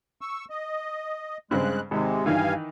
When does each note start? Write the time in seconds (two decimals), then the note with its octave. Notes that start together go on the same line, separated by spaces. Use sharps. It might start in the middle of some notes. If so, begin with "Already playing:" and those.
0.21 C#6 E6
0.50 D#5
1.51 G2 C#3 G#3 C4 F#6
1.91 G#1 C3 G#3
2.26 G2 D#3 E3 F5 G#5